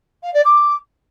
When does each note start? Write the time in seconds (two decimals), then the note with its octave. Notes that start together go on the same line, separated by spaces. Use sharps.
0.22 F5
0.33 D5
0.44 D6